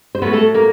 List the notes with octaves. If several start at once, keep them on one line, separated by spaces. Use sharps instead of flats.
C5
A2 F#3 A3 B3 B4
A3 A4
A#3 A#4